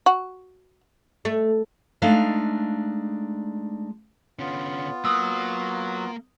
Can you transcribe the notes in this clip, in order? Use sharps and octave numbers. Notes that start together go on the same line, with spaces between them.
F#4
A3
G#3 A3 D4 D#4 F5
D3 B3 C#4 F4
F#3 A#3 D#6 E6